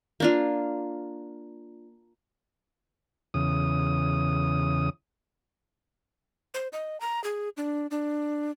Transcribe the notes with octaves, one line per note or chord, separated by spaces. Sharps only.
A#3 D4 F4
E2 C#3 D#6
C5
D#5
A#5
G#4
D4
D4